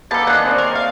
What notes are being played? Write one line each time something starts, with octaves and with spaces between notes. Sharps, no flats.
A#3 B3 G4 A4 A5
D#3 D4 G#4 F#5
C4 C#5 D5
A#4
F5